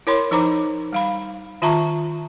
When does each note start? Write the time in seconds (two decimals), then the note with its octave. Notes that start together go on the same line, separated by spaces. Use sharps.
0.07 E4 A#4 C#5 B5 C6
0.31 F3 D#4 C5 A#5 B5 D6
0.93 G3 F5 B5
1.62 D#3 F4 E5 A5 A#5 C#6